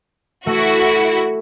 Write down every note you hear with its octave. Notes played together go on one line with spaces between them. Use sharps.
A3 E4 F#4